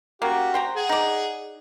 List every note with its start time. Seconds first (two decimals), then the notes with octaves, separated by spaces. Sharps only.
0.22 C#3 A#3 F#4 G4
0.54 C5 G5 A#5
0.76 G#4 F#5
0.89 D#4 D5